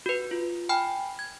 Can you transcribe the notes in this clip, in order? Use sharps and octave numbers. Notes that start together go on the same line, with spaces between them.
F#4 B4
F4
G5 G#5 B5 F6
G#6